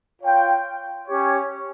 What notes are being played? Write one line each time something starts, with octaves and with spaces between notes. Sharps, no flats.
F4 C#5 G5
C#4 G4 C#5